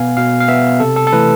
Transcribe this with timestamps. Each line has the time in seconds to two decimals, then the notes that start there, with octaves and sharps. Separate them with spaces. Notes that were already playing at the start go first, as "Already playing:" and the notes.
Already playing: B2 B3 F5 G#5
0.17 B2 F5
0.40 F5
0.48 B3 E5
0.80 C3 A4
0.96 A4
1.07 A4
1.12 E3 A3 B4